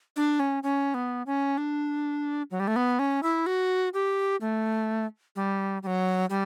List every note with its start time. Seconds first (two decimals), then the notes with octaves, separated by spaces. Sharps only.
0.16 D4
0.39 C#4
0.63 C#4
0.94 B3
1.26 C#4
1.57 D4
2.51 F#3
2.60 G3
2.67 A3
2.76 B3
2.99 C#4
3.23 E4
3.46 F#4
3.94 G4
4.41 A3
5.36 G3
5.83 G3
5.87 F#3
6.30 G3